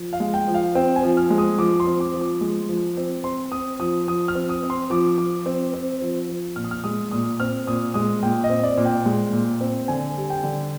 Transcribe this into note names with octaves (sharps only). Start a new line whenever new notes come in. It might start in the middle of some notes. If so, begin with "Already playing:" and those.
Already playing: F3
F5
G#3
G5
F3
F5
C4 G5
G#5
F3
F6
G#3
D#6
F3 D6
C6
C4
D6
F3
D6
G#3
F3
C4
C4 C6
C4 D#6
F3 D#6
F3 D#6
F6
C4
D#6
C4
C6
F3 D6
F3 D6
C4
C4
F3
F3
A#2 F6
D#6
F6
G#3 D#6
A#2 D#6
C4 F6
A#2 D#6
G#3 D#6
A#2 G5
D#5
C4
D5
A#2
G5
G#3
A#2
C4
D3 G#5
G3
G5
D3